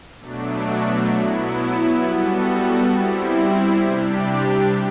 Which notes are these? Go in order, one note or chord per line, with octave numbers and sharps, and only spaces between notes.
B2 F#3 A3 D4
F#3 B3 E4
G3 B3 F#4 A4
G3 C4 E4
C3 G3 D4 G4